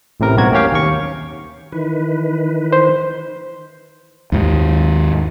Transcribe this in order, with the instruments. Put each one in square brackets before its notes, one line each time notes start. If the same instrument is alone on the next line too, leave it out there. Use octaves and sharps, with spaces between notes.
[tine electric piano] A1 A2 C3 A#4
B1 E2 G2 C3 F#4 G#6
A#3 C#4 G4 C#5 F5 G5
D#2 C#6
[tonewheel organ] D#3 E3 B4
[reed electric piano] C5
[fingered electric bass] D#2 G#2 D#3